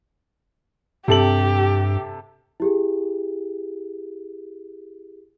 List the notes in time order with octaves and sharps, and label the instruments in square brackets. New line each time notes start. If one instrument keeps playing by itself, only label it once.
[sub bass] G2 [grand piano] C3 A4 F#7 [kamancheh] G4
[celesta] E4 G4 G#4